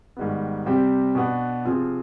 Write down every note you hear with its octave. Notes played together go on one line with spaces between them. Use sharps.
G#2 D#3 G3 B3
C3 G3 C4 G4
B2 B3 D4
C3 F3 C4 F4 G#4